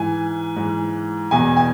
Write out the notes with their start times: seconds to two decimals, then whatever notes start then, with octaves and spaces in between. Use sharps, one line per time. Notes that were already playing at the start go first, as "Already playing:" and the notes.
Already playing: G#2 E3 G#5
0.56 G#2 E3
1.31 E2 B2 G#5
1.57 G#5